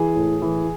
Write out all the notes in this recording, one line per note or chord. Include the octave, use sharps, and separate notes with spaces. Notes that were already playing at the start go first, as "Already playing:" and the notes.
Already playing: E3 G#4
A2
E3